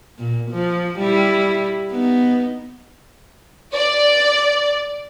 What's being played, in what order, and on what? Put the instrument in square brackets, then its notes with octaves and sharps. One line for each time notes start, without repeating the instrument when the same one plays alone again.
[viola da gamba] A#2
F3
G3 E4
B3 D#4
[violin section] D5